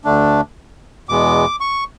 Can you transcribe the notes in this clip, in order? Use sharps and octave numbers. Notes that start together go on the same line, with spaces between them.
D2 D3 A3 D4
E2 B2 G#3 B3 D6
C#6